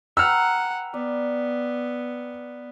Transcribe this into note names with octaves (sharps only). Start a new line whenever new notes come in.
B4 F#5 G5 A#5 E6 F6
B3 D5